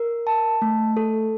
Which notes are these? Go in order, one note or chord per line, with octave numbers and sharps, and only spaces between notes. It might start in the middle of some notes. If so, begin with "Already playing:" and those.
Already playing: A#4
A5
A3
A4